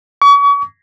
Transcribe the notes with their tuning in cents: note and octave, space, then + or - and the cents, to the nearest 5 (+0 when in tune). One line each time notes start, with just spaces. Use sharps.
C#6 +40